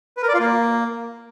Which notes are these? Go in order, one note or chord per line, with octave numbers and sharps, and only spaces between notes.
B4
A#4
D5
F4
A#3